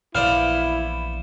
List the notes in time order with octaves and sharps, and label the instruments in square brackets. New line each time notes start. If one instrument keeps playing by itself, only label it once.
[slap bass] A#1 E3 [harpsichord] B3 C5 D5 [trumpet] E4 [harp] F5